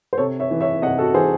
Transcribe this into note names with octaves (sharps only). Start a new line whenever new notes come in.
C5
C3 A4 C#5
C#5 E5
E3
C#5 E5
C3 D#5 F#5
F#4 A4
E3 G#4 C5